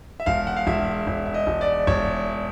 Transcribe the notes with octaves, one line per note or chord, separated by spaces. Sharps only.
E5
E1 F5
F#5
F5
E1 E5
E1
E5
D#5
E1
D5
E1 C#5